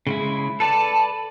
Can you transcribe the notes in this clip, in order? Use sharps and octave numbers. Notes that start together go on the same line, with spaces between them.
C#3 G#3 E4
A4 B4 D5 A5